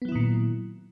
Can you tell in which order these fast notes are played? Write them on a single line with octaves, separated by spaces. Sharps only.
B3 F#3 E4 D#3 A#2